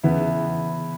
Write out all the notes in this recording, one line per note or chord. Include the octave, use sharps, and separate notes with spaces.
E2 C#3 E3 B3 E4